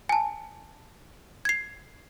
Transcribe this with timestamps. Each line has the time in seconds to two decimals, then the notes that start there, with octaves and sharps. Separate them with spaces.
0.09 G#5 A5
1.45 G#6 C7